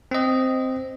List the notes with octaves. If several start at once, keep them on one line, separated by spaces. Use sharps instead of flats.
C4 D#5